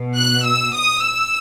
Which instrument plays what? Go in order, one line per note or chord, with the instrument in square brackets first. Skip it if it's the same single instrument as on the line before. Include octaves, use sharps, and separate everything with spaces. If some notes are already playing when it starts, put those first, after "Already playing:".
Already playing: [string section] B2
F#6
E6
D#6
E6